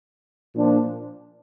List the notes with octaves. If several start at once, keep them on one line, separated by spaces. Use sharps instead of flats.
A#2 F3 D4